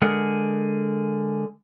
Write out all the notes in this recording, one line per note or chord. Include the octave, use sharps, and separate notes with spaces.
D3 G#3 G#4 A#4 F#5